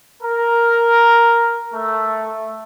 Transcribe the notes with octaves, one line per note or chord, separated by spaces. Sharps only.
A#4
A3